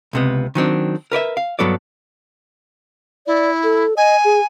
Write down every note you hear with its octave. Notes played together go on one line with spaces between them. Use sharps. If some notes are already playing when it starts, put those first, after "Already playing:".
C#2 C3 B3
D#3 F#3 C4 D4
A#4 B4 D5 E5
F5
G2 F#3 B3 A4 D5
E4 D5
A4
D#5 G#5
G#4